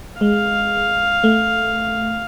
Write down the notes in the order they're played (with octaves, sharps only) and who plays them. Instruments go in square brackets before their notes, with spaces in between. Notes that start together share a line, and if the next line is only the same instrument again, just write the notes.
[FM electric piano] G#3 [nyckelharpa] F5
[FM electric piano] A3